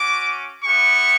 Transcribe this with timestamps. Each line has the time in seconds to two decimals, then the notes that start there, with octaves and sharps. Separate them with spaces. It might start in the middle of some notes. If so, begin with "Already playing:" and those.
Already playing: C#4 F#4 D6
0.64 B3 E4 G4 C#6